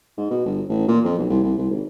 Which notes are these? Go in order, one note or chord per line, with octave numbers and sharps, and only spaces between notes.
G#2
B2
G1
A1
A#2
F2
B1
C2
C2
C2
G#1